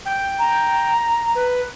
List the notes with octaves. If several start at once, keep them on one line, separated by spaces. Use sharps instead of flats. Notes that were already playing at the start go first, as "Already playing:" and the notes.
G5
A#5
B4